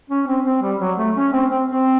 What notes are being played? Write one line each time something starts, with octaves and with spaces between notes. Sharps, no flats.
C#4
C4
C4
G3
F#3
A3
C#4
C4
C4
C4